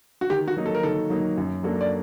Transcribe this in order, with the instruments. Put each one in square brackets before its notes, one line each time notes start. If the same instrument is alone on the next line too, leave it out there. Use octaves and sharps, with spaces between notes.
[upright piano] F#4
[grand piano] D#3 [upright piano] G4
[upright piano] F#4
[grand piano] F#3 A#3 D#4
[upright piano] A4
A#4
[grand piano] D#3 [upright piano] A4
[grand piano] F#3 A#3 D#4
F#2
F#3 A#3 D4 A4
[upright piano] D5